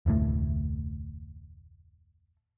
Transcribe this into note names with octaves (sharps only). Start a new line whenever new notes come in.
F1 D2 A2 A3